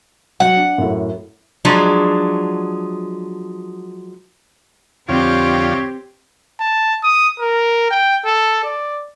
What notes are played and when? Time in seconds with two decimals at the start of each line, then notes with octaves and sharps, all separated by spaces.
0.40 F#3 F#5
0.56 D4
0.78 F#2 A2
1.65 F3 F#3 G#3 D4
5.09 F2 D3 C4 F4 G4 C#5
6.60 A5
7.03 D#6
7.40 A#4
7.91 G5
8.25 A4
8.64 D5